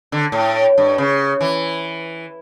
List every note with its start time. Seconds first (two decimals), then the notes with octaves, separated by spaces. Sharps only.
0.12 D3
0.32 A2
0.78 G2
0.98 C#3
1.41 E3